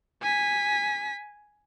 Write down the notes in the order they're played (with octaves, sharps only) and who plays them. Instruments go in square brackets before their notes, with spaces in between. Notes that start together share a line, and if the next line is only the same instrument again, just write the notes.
[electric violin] G#5 B6